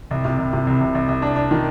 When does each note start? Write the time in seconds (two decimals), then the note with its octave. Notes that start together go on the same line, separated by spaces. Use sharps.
0.11 C2
0.25 C3
0.39 C2
0.53 C3
0.67 C2
0.81 C2
0.95 C2
1.09 C2
1.22 D4
1.36 D4
1.51 D#3